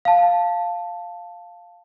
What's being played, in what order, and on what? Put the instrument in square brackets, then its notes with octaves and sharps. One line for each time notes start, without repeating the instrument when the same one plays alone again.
[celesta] F5 A5